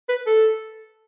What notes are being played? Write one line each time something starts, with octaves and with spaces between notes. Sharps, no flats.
B4
A4